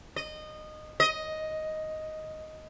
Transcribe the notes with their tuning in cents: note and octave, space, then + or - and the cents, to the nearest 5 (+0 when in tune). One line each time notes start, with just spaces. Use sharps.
D#5 -20
D#5 +5